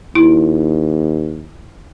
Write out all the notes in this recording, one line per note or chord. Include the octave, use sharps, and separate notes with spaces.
D#2 E4